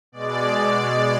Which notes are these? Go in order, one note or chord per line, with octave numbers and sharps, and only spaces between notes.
B2 G#3 D5